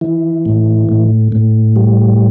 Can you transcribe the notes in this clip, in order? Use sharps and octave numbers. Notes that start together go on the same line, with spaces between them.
E3
A2
A2
A2
G3